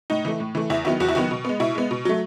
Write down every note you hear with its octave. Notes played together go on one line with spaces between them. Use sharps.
A2 D#4
E3 A3
A2
E3 A3
E2 E4
D#3 F#3 B3 E4
E2 F#4
E4
D#3 F#3 B3 F#4
B2
G#3 B3
B2 E4
G#3 B3
B2
F#3 A3